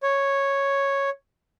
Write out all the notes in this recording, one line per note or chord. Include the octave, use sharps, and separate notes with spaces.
C#5